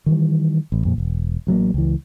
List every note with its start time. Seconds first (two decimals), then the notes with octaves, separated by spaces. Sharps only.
0.06 D#3 E3 G3
0.72 A1
0.85 F2 A#2
0.98 E1
1.47 A1 F#3 A3 A#3
1.74 C#2 E3